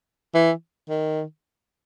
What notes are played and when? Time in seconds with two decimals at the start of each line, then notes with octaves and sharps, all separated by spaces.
0.34 E3
0.89 D#3